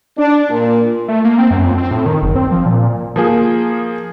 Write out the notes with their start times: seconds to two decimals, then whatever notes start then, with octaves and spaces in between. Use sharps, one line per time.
0.17 D4
0.50 A#2
1.08 A3
1.25 A#3
1.38 C4
1.51 F#2
1.64 F2
1.78 C4
1.91 A2
2.06 D#3
2.22 F#1
2.35 C4
2.51 F3
2.66 A#2
3.16 F3 A#3 G#4